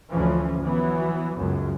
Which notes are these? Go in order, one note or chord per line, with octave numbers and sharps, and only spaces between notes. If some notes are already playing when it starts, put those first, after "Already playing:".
D2 E3 F3 C#4
E3 F#3 B3
C#2 F#2